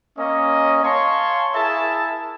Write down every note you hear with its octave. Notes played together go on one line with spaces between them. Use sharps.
A#3 C#4 D#5
C#5 F5 G#5 A5 C6 C#6
E4 G#4 A#4 E5 A5